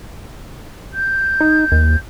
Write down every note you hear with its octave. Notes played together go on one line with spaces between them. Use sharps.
G6
D#4
D#2